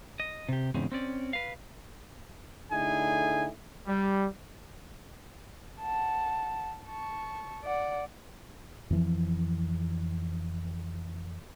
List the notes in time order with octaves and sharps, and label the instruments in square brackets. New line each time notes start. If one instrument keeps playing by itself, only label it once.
[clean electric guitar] D#5
C3 G4
E2 G#2 C#3 C4
C4 C#4 D5
B4 F5
[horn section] D3 A3 D#4 E4 G#4 G#5
G3
[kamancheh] F#5 A5
A5 C#6
D5 F#5
[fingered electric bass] F2 E3 F3